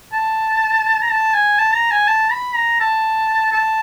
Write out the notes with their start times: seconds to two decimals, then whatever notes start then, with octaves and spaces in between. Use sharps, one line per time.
0.13 A5
1.02 A#5
1.10 A5
1.34 G#5
1.59 A5
1.74 A#5
1.91 G#5
2.07 A5
2.31 B5
2.55 A#5
2.80 A5
3.52 A5